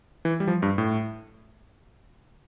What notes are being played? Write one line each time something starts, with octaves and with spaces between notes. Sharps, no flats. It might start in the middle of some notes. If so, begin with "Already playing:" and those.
E3
G3
F3
G2
A2